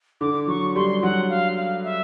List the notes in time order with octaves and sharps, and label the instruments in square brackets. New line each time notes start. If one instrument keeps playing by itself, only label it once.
[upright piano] D3 [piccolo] D6
[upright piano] F#3 [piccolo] C#6
[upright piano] G3 [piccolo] C6
[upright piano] F#3 [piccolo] F#5
[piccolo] F5
F5
E5